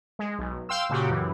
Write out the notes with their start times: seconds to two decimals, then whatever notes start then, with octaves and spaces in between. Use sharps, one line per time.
0.19 G#3
0.39 B1
0.69 F5 G5 C6 E6
0.89 A#2 C#3 F#4 G4
1.10 F#2 E3